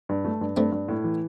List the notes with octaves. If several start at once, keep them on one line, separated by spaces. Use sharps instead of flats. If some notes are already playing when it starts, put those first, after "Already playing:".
G2
A3
G2
G2 A3 C4
G2
A2
E3